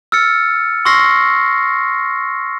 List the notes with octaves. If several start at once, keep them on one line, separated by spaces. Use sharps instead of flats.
E6 F6 A6 C#7
C6 C#6 E6 F6 A#6 C7